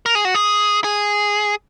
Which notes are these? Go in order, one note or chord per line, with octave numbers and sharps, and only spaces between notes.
A#4
G#4
F#4
G#4
G#4